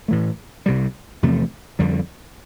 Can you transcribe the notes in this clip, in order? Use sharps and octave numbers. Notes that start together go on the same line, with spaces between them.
A2 E3 A3
C2 C3 G3
E2 C3 F3 A3
F2 D3 G3